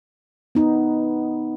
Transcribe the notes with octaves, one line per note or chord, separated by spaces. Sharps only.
B3 D#4